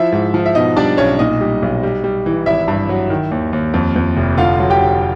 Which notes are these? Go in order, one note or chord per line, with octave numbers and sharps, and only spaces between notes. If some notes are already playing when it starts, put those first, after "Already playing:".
Already playing: F3 E4 E5
G#2
F3
E5
B2 D#4 D#5
G3 D4 D5
B1 C#4 C#5
A#2 D#4 D#5
G3
B1
G3
G3
E3
G#1 E4 E5
G2
F#3
D#3
D#2
D#2
F2
F2
F1
D3 F4 F5
F#3
G4 G5
D3